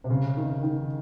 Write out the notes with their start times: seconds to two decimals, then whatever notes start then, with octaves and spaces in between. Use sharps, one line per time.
0.04 C3
0.10 C#3
0.37 D#3
0.63 D#3